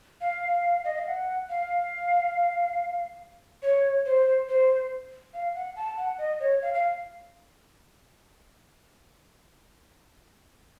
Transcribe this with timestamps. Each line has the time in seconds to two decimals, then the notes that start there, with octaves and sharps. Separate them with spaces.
0.21 F5
0.85 D#5
0.96 F5
1.06 F#5
1.49 F5
3.62 C#5
4.06 C5
4.49 C5
5.34 F5
5.55 F#5
5.76 A5
5.97 F#5
6.18 D#5
6.40 C#5
6.62 F5
6.74 F5